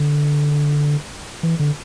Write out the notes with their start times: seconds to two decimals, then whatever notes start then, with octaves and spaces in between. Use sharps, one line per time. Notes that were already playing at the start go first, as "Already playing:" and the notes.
Already playing: D3
1.43 E3
1.59 D3